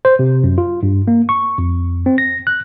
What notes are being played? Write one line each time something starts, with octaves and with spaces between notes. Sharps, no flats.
C5
C3
F#2
F4
G2
A#3
C#6
F2
C4
A#6
F#6